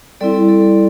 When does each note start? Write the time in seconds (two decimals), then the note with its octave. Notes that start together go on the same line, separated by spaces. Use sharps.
0.21 G3 C4 E4 A4 D5
0.49 A4 D5